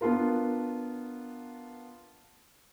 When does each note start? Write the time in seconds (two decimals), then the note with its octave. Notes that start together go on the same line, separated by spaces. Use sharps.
0.01 B3 D4 F4 A#4